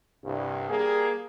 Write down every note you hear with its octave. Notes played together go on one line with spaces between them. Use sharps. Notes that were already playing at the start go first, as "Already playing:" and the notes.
C2 G2
G3 A#3 G#4